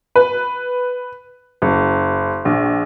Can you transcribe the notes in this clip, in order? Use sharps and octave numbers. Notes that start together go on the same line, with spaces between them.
B4
F#1
A#1